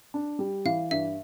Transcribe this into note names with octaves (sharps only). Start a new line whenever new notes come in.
D4
G3
E3 F5
G2 E5